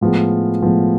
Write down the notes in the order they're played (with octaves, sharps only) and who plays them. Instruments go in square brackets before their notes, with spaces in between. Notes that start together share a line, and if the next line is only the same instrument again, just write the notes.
[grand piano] A2 F3 G#3 B3
A2 F3 G#3 B3